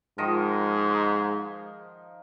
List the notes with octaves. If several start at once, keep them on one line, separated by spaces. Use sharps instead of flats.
G#2 D#3 F3 D#5